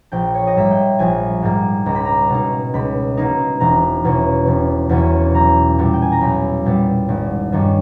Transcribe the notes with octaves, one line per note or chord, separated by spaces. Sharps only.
A#1 G5
C#5
D#5
G#2 G3 A#3 E5
G5
A#1 G#5
G#2 G3 A#3
C#2 A#5
B5
A#5
B2 A#3 D#4
C#2 B5
B2 A#3 D#4
E1 A#5
E2 B2 A#3 C#4
E1
E2 B2 A#3 C#4
B1 A#5
A#2 G3 B3
G5
G#5
A#5
B1 B5
A#2 G3 B3
G#1
G2 D#3 G3 C#4